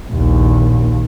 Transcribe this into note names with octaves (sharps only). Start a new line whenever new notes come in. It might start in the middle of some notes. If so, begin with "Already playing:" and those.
A#1 D#2